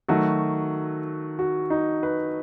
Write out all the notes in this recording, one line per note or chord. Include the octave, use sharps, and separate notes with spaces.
D#3 F#3 A3 F#4
F#4
D#4
B4